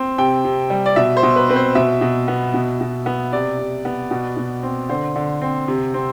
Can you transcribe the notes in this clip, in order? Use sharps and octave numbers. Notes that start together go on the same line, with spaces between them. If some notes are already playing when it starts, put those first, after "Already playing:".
Already playing: C4
C3 G5
C3
G3
D5
B2 E5
C5
B2
B4
C4 B4
C5
B2 E5
B2
B3
B2
B2
B3
C3 D5
C3
B3
B2
B2
C4
D3 C5
D3
C4
C3
C4